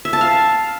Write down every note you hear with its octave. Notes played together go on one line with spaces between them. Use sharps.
E5
A5
F5